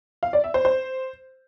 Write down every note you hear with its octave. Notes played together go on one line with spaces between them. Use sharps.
F5
D5
E5
C5
C5